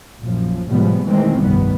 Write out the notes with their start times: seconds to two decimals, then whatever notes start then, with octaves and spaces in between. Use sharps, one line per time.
0.19 A#1 F#2 F3
0.68 A2 C3 F3 G3 G#3 B3
1.05 B2 D#3 E3 G#3 A3 C4
1.41 F1 C2 G2 D#3 G3 B3